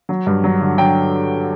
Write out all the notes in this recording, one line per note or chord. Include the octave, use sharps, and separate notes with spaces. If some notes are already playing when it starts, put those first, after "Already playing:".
F#3
G2
F#3
D3
F#3 G5